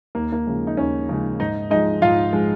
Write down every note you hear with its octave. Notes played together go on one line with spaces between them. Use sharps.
D#2 A#3
A#3
C#3 F3 G#3
D#4
D#2 C#4
C#3 F3 G#3
G#2 D#4 D#5
F3 G#3 D#4 D#5
G#2 F4 F5
F3 G#3